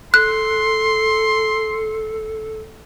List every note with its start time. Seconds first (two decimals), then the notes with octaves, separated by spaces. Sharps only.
0.14 A4 C6 F#6